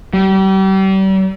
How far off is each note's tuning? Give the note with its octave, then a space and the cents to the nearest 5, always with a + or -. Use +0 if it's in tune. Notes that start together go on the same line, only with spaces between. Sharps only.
G3 -35